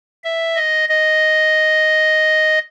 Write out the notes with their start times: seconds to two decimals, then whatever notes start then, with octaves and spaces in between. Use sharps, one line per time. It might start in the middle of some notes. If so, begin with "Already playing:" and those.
0.24 E5
0.56 D#5
0.89 D#5